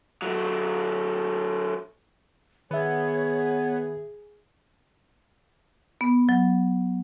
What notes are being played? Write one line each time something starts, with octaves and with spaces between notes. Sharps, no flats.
F#3 A3
D#3 B3 G#4 C#5 E5
B3
F#3